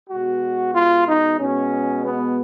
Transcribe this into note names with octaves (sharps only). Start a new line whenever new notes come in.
B2 G#3 F#4
F4
D#4
B2 G#3 C#4
B3